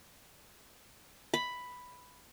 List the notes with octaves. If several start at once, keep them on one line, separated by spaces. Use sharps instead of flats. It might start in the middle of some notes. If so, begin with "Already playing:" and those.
B5